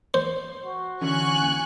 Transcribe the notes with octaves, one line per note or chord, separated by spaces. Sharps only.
C5 C6
F#4
D3 E3 C#4 G#5 C#6 F#6